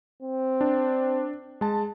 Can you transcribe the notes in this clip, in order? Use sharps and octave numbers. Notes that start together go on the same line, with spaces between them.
C4
D4
G#3 A5